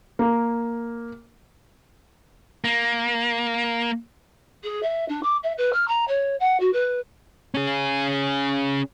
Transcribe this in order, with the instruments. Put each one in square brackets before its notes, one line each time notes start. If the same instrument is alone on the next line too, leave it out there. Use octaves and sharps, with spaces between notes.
[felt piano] A#3
[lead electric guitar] A#3
[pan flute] G#4
E5
D4
D6
E5
B4
F6
A#5
C#5
F#5
F#4
B4
[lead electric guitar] C#4 G#4